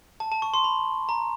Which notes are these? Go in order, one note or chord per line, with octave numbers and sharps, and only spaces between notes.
A5
A5
C#6
C6
B5
A#5